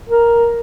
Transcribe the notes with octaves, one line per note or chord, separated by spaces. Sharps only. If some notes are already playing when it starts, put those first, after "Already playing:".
A#4